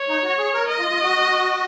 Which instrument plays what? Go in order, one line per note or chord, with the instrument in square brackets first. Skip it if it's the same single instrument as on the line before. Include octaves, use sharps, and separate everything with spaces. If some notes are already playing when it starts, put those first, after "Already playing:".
Already playing: [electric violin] C#5
[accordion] D#4
F#4
G#4
A#4
[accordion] A#4 [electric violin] D#5
[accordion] F4
F4
F#4